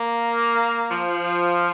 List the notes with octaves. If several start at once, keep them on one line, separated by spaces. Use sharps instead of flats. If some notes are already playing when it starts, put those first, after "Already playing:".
Already playing: A#3
F3